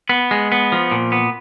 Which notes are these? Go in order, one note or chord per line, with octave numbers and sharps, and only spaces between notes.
B3
G#3
B3
F3
A#2
B3